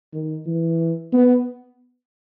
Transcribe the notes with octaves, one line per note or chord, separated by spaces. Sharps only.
D#3
E3
B3